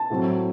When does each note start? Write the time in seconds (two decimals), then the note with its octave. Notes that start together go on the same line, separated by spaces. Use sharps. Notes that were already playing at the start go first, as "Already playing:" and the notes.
Already playing: A5
0.10 A2 F#3 C4